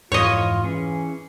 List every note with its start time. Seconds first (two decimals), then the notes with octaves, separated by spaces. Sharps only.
0.12 F2 G#2 E3 F4 C#5 D#5
0.64 E3 C#4 G#4